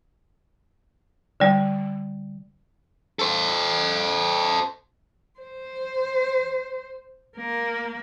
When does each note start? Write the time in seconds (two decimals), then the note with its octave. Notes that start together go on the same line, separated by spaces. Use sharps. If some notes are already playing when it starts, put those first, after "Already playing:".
1.40 D3 G3
3.19 A4 C5
5.40 C5
7.37 A#3